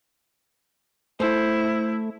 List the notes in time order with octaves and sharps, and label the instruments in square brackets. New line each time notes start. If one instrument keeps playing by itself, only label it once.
[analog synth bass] A3 [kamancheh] E4 [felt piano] C5